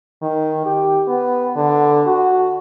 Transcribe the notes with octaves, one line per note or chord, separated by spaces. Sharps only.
D#3
G4
B3
D3
F#4